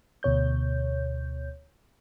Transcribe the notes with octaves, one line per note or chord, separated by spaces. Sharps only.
D2 B2 C#5 G6